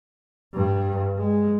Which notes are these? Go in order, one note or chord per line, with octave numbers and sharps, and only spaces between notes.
G2
G#3